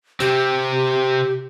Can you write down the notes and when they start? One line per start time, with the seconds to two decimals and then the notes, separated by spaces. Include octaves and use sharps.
0.20 C3 C4 G4